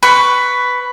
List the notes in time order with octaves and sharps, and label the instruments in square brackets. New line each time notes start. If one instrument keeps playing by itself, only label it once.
[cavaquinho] B4 C#6